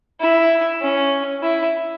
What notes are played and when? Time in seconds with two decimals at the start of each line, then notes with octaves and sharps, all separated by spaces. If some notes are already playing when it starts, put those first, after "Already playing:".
0.20 E4
0.81 C#4
1.42 E4